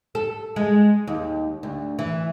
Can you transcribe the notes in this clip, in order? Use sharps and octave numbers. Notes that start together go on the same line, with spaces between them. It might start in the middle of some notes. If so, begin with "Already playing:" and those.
A4
G#3
D#2
D2
E3